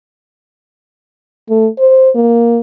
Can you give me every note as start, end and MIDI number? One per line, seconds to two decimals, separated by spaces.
1.49 1.68 57
1.79 2.10 72
2.15 2.61 58